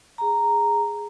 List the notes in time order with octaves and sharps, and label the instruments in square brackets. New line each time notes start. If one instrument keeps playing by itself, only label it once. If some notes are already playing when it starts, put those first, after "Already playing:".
[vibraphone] G#4 A#5